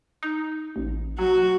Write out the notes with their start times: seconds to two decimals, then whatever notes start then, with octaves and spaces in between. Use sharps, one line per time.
0.23 D#4
0.76 A1
1.19 F#3 F#4